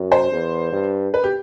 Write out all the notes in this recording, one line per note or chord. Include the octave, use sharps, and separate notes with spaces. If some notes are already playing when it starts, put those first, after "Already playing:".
Already playing: F#2
C5
E2
G2
B4
G4